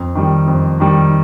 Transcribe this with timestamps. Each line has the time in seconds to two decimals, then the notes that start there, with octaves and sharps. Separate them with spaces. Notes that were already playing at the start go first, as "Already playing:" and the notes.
Already playing: F2
0.15 D#3 G3
0.48 F2
0.80 D#3 G3